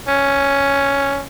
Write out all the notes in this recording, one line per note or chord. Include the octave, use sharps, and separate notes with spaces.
C#4